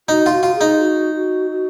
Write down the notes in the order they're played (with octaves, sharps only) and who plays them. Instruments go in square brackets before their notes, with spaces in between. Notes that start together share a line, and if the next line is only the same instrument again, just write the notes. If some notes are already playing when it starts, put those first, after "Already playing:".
[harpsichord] D#4 [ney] F#4
[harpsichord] F4
[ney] F#4
[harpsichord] F4
[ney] G#4
[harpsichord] D#4
[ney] F#4
F#4
F#4